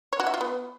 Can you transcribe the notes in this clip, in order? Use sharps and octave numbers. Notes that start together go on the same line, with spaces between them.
C#5
F#4
E5
F4
B3